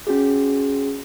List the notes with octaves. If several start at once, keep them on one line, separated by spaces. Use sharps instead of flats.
C#4 F#4 G#4